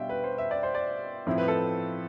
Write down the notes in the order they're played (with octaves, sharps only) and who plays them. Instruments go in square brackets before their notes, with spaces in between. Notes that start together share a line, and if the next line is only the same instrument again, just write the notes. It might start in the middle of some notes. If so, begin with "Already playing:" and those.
Already playing: [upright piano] B2 G3 D4 F4 E5 F5 G5
B4
C5
E5
D5
C5
D5
A2 F3 C4 E4
B4
A4